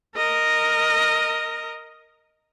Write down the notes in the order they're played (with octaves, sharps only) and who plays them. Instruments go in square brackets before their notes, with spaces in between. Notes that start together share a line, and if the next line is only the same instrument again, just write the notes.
[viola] A#4 D#5